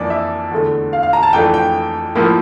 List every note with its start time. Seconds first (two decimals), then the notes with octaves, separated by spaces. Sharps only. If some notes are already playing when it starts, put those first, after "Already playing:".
Already playing: F2 E3 A#3 D4 D5
0.10 E5
0.51 E2 D3 A3
0.93 F5
1.03 F5
1.13 A#5
1.23 A5
1.33 F2 E3 A3 D4 G5
1.54 G5
2.15 A2 F3 A#3 E4